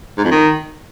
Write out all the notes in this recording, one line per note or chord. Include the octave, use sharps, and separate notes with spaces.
G#2
F2
D#3